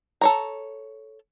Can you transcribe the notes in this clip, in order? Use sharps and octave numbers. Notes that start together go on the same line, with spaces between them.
A4 C#5 A#5